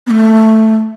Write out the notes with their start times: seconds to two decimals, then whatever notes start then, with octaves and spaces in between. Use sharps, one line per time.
0.07 B3
0.11 A3